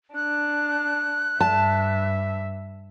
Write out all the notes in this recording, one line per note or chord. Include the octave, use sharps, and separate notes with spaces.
D4 F#6
G2 E5 A5